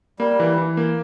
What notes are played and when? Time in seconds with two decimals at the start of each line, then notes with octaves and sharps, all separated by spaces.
0.19 G3 A#3
0.40 E3
0.58 E3
0.77 A#3